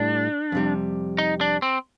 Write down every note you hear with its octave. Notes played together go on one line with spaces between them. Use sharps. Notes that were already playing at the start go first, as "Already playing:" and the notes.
Already playing: A2 G3 D4
F2 C3 G3
D#4
D4
C4